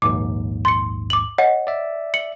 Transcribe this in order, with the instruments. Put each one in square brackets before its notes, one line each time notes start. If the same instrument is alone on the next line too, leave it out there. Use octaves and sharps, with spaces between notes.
[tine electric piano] A#1 D#2 G#2 [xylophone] D6
[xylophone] C6 C#7
D6 F#7
C#5 D#5 F#5
[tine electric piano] D5 E5
[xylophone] C#7 F#7